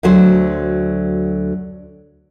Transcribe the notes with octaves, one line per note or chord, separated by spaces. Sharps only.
D2 D3 F#3 C5